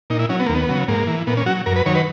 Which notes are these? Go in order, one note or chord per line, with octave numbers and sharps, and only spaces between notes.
A#2 D#4
E4
F#3 C#4
B3
A#3
D#2
B3
C#3 F#3
G#2 A#3
E3
A#2 B3
C#4
F#3 F#4
F#2 A#4
B4
D#3 F#3 C#5
B4